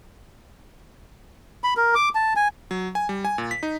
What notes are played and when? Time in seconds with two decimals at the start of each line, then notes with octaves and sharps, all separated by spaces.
1.64 B5
1.77 A#4
1.95 D6
2.15 A5
2.36 G#5
2.71 F#3
2.95 G#5
3.09 G3
3.25 G#5
3.38 A#2
3.51 B6
3.63 D#4